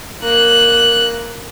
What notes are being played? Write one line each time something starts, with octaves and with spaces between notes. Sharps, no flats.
A#3 F#6